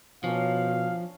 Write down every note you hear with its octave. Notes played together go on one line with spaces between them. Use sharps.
B2 F3 C#4 D4 A#4 F5